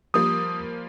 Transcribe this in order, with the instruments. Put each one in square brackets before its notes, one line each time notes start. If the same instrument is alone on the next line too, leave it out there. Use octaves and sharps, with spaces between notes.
[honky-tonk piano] F3 G3 A#3 [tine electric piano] D#6